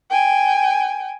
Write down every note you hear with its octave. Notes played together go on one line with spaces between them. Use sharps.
G5 G#5